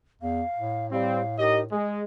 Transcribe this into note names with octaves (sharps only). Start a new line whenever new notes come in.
E2 F5
A2
G3 C4 F5
D#4 G4 A#4 D#5
G#3 G#4